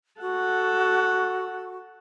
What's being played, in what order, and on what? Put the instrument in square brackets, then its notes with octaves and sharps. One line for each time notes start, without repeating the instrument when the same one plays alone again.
[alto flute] F#4 [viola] A4 F#5